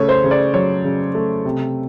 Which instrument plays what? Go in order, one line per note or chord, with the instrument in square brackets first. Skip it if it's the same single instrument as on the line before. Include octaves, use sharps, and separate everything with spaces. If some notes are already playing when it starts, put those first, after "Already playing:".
Already playing: [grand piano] C#3 A3 C#5
C5
C#3
D5
F#3 C#5
C#3
A3
C3